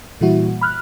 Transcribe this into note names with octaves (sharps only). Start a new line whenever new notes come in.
A#2 E3 G3 A#3 E4 F#4
B5 F6 F#6